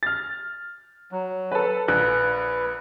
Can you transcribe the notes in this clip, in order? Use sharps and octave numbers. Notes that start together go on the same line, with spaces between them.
F6 A6
F#3
A4 B4
A#1 B4 F#6